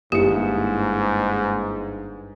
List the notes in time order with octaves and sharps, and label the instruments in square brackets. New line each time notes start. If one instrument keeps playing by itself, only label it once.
[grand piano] G1 C#7 [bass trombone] G#2 [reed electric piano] A#3 D#4 E4 [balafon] G4